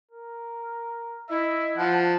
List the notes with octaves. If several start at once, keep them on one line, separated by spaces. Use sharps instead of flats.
A#4
E4 D#5 E5
F3 F#5 A5